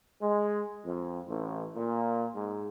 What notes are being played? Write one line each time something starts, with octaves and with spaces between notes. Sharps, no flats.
G#3
F2
A1
A#2
G#2